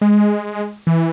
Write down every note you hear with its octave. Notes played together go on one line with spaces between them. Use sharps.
G#3
E3